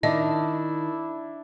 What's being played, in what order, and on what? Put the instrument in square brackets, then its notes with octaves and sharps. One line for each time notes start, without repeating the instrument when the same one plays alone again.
[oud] D#3 [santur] D4 E5 [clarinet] E4 [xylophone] D#5